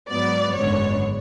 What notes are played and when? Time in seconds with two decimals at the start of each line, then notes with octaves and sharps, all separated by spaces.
0.10 G#2 F#3 B3 D5
0.56 G#1 F#2 D3 G#3 B3 C#5